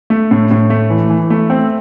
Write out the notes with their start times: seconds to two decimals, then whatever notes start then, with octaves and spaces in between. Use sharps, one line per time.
0.10 A3
0.31 A2
0.51 A2
0.70 A3
0.90 E3
1.10 E3
1.30 A3
1.50 C4